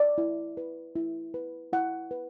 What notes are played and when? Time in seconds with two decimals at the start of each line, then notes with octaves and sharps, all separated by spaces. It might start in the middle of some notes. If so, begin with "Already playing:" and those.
Already playing: D5
0.18 E4
0.57 B4
0.96 E4
1.34 B4
1.73 E4 F#5
2.11 B4